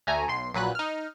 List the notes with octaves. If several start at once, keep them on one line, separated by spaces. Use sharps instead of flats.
D2 A3 G#5 A#5
B1 C6
A#1 A#2 F#3 B4 F#6
D#4 F6